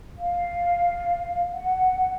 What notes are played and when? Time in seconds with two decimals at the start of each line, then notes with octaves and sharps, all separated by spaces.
0.18 F5
1.51 F#5